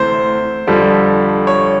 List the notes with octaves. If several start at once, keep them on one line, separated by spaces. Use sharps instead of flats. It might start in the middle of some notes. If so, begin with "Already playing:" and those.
Already playing: D2 C3 E3 C5
F2 D3 G3
C#5